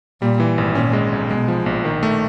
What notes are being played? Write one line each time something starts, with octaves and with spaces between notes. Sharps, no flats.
A#2 G3
E3
G#1
A#2 C#4
G#3
B1
B2 G#3
F3
A#1
D#3
A3